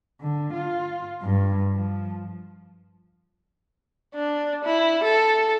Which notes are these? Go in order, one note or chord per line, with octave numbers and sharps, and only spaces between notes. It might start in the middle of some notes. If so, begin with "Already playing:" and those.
D3
F4
G2
F3
D4
E4
A4